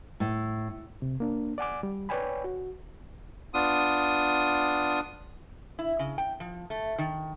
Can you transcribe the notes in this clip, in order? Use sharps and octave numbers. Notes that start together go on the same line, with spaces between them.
A2
C3
A#3 D4
D5 F#5 G#5 D6
G3
B4 C#5 D5 G5 G#5 B5
F#4
B3 D4 F4 D#6
E4
C#3
G5
F3
A3
D#3